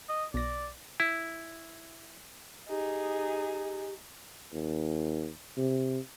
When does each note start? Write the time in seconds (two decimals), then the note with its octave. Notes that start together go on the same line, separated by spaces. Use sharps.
0.09 D#5
0.34 B1 D5 A#6
1.00 E4
2.69 D#4 G4 G#4
4.53 D#2
5.57 C3